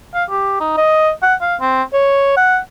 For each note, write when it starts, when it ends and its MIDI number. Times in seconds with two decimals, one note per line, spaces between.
0.14 0.24 77
0.30 0.56 67
0.60 0.75 63
0.78 1.11 75
1.23 1.35 78
1.41 1.56 77
1.61 1.83 60
1.93 2.36 73
2.37 2.59 78